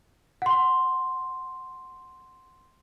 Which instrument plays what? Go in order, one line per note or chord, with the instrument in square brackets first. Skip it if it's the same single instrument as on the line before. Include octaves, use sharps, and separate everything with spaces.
[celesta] F#5 C6